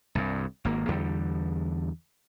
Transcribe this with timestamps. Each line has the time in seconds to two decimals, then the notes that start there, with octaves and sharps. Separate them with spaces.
0.15 C2 G2
0.65 G#1 A#3
0.88 E2 D3 G3